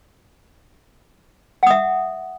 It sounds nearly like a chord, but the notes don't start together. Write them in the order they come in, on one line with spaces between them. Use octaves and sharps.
F#5 D#6 E5